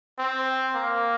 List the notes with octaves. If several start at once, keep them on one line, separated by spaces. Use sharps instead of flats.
C4
A#3